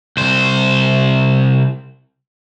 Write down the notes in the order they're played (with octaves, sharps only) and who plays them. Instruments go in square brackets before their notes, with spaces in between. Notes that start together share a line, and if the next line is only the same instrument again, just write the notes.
[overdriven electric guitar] C2 C5